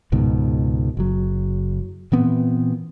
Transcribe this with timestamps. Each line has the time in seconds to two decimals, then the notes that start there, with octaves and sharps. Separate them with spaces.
0.12 C#2 G#2 B2 D#3
0.97 F#1 F#3
2.12 A#2 E3 B3 C4